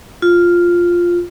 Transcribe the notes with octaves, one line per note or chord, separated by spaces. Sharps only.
F4